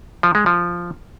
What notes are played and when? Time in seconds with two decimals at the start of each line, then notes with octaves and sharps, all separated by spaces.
0.23 F3
0.35 G#3
0.46 F3